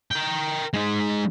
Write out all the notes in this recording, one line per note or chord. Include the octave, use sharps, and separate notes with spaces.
A#4 G5
G#3 D#4